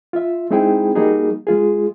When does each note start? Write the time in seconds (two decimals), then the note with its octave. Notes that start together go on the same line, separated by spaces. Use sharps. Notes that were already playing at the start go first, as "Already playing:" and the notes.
0.13 F4 E5
0.51 G#3 C4 D#4 E4 G#4 G5
0.95 G3 A#3 D#4 F#4 G#4
1.47 G#3 F4 G#4